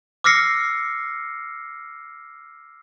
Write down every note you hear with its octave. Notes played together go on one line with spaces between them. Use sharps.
D6 E6 F6 A#6 C7 C#7